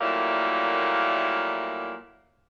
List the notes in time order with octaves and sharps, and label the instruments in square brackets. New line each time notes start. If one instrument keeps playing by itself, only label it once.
[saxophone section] A#2 F#3 G3 A3 A#3 E4